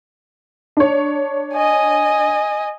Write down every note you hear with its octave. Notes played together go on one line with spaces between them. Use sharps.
D4 C#5
D#5 G#5